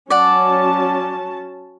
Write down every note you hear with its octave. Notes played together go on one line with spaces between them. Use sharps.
F#3 C#4 D5 F#5 A5